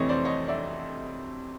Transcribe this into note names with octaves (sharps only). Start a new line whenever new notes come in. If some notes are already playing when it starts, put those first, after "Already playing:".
Already playing: F2 C3 E3 A3 C4 C#5 D#5
C5 D5
C#5 D#5
D5 E5